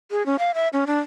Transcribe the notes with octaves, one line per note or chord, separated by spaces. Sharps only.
G#4
C#4
F5
E5
C#4
D4